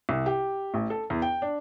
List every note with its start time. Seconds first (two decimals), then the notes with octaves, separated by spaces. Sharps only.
0.09 C2
0.26 G4
0.74 A1
0.90 A4
1.10 E2
1.22 G5
1.42 D4